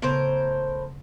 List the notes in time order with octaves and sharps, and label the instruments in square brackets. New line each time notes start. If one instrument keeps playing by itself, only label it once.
[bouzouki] A2 A#4 C5 [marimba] C#3 B3